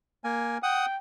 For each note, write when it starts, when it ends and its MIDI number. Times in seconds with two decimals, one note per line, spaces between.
0.24 0.58 58
0.24 0.58 80
0.63 0.86 78
0.63 0.98 79
0.63 0.86 87